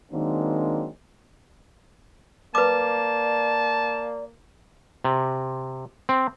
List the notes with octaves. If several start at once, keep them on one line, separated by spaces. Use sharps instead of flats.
D#3 F#3 G#3 A#3 C4 D4
A#3 B4 D5 A5 D6
C3
C4